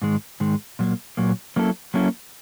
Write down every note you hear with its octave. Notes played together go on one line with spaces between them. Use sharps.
G#2 D#3 G#3
G#2 D#3 G#3
A#2 F#3 A#3
A#2 F#3 A#3
F#3 A#3 C#4 E4 A4
F#3 A#3 C#4 E4 A4